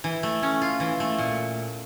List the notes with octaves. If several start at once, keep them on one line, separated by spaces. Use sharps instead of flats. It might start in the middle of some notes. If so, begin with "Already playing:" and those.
E3
A3
C#4
F4
E3
A3
A#2